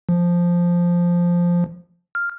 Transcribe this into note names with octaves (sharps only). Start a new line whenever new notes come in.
F3
F6